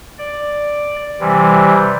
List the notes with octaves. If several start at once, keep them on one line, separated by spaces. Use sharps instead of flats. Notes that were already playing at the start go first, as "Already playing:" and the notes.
D5
C3 E3 G3